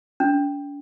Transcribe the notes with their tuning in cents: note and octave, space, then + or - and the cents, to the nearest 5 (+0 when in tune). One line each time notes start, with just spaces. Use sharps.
D4 -40